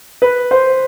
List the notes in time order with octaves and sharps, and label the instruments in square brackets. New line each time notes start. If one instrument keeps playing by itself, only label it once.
[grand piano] B4
C5